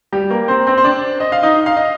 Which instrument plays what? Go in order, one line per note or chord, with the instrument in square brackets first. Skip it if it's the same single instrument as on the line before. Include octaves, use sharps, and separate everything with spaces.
[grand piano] G3 G4
A#3 A#4
C4 C5
C4 C5
C5
D4 D5
D#5
F5
D#4 D#5
F5
D#5